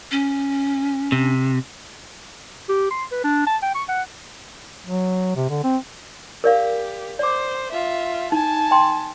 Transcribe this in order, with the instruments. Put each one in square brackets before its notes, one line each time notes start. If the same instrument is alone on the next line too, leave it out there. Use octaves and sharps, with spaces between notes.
[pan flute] C#4
[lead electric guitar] C3
[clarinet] G4
C6
B4
D4
A5
G5
C#6
F#5
[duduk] F#3
C3
D3
C4
[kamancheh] G4 [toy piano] A#4 D5 F5
[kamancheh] C5 [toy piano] D5 D6
[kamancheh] F4 E5
[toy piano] D#4 [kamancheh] G#5 A5
[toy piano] G5 C6